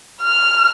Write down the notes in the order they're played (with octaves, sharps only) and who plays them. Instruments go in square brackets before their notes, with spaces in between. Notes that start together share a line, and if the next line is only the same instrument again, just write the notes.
[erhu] F6